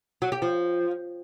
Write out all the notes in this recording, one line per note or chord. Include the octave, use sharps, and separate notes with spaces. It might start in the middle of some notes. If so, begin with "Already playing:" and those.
F#3
G4
F3